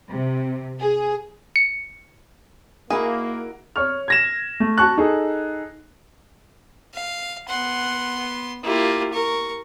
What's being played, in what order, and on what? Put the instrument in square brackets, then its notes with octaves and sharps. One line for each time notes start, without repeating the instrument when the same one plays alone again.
[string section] C3
G#4
[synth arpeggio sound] C#7
[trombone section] A#3 [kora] D#4 E4 [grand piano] F#4 A#4 [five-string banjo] G#4
[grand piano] C#5 C#6 F6
G#6 A#6 E7
A3
F#4 A5 C#6 F#6
D#4 G#4 A4
[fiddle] F5
[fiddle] B3 C6 [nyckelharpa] F#5
[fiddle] A#3 F4 [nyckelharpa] E4 G4
[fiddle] A#4 [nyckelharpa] C#6